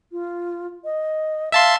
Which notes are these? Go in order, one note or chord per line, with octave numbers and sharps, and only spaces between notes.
F4
D#5
E5 F5 A5 C6